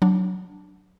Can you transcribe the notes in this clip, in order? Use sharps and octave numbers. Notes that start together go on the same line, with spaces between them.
F#3 D4